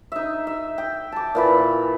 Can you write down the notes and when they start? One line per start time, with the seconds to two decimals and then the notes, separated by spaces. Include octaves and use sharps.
0.12 D#4 E5
0.47 E5
0.78 G5
1.12 A5 D6
1.35 A#2 E3 B5